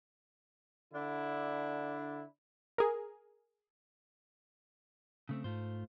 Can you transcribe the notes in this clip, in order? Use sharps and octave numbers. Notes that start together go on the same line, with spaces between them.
D3 D4 E4
G#4 A#4
C#3 A3 C4
G#2 A3 F4 C5